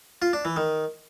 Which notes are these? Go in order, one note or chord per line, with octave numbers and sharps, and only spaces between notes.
F4
D4
E3
D#3